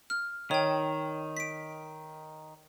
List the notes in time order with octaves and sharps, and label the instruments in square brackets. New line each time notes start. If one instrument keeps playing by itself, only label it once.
[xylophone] F6
[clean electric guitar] D#3 [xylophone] C#5 G5
[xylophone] B6 D7